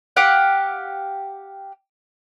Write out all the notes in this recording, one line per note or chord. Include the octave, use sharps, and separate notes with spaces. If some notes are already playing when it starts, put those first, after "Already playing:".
G4 F5 F#5